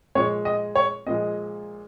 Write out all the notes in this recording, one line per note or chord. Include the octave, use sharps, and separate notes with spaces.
A#2 F3 G#3 C#5
D#5
C#5
A#2 F3 G#3 D#5